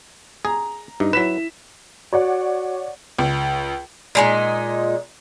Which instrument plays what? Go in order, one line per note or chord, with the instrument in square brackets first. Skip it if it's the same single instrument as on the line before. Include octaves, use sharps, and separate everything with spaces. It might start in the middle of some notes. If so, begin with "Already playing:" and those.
[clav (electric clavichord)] G#4 [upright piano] A#5
[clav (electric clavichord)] G2 [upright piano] D#4
[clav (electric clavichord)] F#3 B4 [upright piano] E4 B6 E7
[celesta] F#4 [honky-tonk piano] C#5 D5 F#5
[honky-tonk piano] C#2
[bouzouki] A#2 G#3 D#4